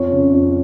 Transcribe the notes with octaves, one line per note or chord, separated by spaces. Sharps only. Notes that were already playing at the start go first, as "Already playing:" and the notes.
Already playing: F2 C#5
C#3
F2